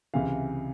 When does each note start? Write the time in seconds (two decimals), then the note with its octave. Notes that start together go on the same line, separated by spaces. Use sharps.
0.14 C#2 C3 E3 F5